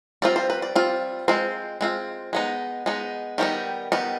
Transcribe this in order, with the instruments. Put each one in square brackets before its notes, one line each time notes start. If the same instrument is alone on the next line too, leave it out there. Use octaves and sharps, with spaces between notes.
[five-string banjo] G3 C4 F4 D5
C5
B4
D5
G3 C4 F4
G#3 C4 F4 C5
G#3 C4 F4
G#3 B3 D#4
G#3 B3 D#4
D#3 G3 B3 D#4 G4
D#3 G3 B3 D#4